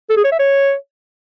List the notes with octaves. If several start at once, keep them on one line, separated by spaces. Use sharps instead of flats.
A4
G#4
C#5
E5
C#5